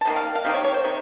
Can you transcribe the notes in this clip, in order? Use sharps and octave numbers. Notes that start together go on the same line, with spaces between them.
A5
C3 D#3 A#3
F5
F5
C3 D#3 A#3
C#5
C#5
C5
C3 D#3